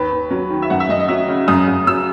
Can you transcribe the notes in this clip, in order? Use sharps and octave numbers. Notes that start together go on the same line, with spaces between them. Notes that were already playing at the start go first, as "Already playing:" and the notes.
Already playing: D#2 B4
D#2
F#3
D#3
E5
F#2 F#5
E5
F#2 D#5
D#5
F#3 E5
C#3
F#2 D#6
F#2
F#3 E6